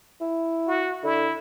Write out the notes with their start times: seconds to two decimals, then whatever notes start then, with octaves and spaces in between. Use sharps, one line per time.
0.21 E4
0.67 F#4
1.04 D3 E4